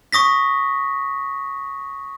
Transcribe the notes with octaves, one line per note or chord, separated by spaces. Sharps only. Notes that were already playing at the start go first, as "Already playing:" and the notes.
C#6 D#6 A#6 B6